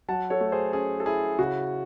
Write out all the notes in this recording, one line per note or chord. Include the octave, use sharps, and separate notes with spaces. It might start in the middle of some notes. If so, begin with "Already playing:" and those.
F#3 F#5 A5
A4 C#5
A3
G#4 C5
C#4 G#4
A4
E4 G#4
C#3 F#4